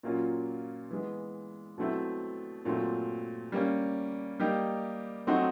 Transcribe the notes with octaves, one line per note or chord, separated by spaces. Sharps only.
A#2 F#3 A#3 C#4 F4
E3 G#3 B3
B2 F#3 A3 C4 E4
A#2 F#3 A3 C4
G3 A#3 C#4
G3 A#3 D#4 G4
F#3 A3 C4 D#4 F#4